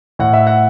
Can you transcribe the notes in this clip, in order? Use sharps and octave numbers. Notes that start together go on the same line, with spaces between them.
A2 F#5
E5
F#5